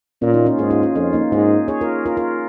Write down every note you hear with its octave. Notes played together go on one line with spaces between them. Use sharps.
A#2 C#4 F4
A#3 D#4
C#4 F4
G#2 D#4 G#4
C#4 F4
C#4 F4
F2 C#4 F4
A#3 D#4
G#2 D#4 G#4
G#4 C#5
F4 A#4
F4 A#4
F4 A#4